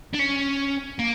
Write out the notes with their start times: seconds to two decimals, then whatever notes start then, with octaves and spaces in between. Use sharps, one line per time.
0.13 D4
0.19 C#4
0.99 A#3